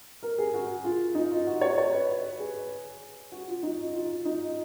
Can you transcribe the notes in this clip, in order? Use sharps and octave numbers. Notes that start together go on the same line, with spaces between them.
A#4
G#4
F#4
F4
D#4
F4
F#4
C#5
C#5
B4
G#4
F#4
F4
D#4
F4
D#4